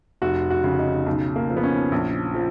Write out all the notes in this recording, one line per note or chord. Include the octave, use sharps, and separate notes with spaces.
F1 F#4
F#4
C#3
D#4
B1
A#3
F3
B3
C#4
A#1
F3